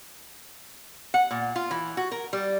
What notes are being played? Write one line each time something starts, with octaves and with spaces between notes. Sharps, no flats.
F#5
A#2
F4
E3
F#4
A#4
G3